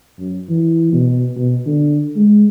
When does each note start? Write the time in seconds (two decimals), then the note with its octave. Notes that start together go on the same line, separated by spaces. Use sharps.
0.19 F#2
0.50 E3
0.92 B2
1.36 B2
1.66 D3
2.16 G#3